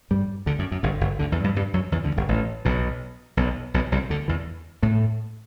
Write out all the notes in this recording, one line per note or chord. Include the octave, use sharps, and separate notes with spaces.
G2 G3
D2 D3
F#2
F#2
G1 G2
G1 G2
D2 D3
E2 E3
G2 G3
G2 G3
F#2 F#3
E2 E3
D2 D3
G1 G2
A1 A2
B1 B2
B1 B2
B1 B2
C2 C3
D2 D3
E2 E3
A2 A3